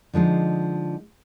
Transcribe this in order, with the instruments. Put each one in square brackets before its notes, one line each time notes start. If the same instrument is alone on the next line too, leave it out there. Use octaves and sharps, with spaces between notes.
[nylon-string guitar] D3 F3 G#3 D#4